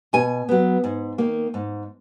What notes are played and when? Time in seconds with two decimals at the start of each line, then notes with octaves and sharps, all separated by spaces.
0.13 B2 G#5
0.49 F#3 B3
0.84 G#2
1.18 D#3 A#3
1.54 G#2